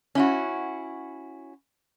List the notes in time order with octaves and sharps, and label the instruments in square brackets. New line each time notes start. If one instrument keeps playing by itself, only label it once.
[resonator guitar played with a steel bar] C#4 E4 F#4